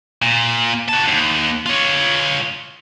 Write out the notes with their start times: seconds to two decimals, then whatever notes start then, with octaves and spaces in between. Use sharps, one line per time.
0.22 A#2
0.88 F#4 A5
1.08 D#2
1.66 F4 C#5